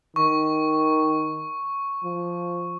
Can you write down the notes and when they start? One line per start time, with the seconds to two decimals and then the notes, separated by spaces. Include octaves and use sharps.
0.16 D#3 C#6
2.04 F3